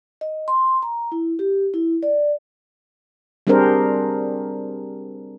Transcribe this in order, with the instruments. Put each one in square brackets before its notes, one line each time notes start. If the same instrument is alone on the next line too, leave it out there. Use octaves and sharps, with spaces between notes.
[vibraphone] D#5
C6
A#5
E4
G4
E4
D5
[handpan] G3 C4 D4 G#4 A#4 C5